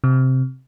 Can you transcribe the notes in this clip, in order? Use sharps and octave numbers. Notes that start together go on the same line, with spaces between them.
C3